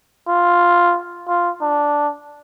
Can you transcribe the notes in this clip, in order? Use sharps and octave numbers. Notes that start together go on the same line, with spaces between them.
F4
F4
D4